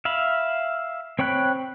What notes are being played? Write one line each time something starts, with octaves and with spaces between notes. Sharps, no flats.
E5 F5 B5
C4 C#5 G5 B5 F#6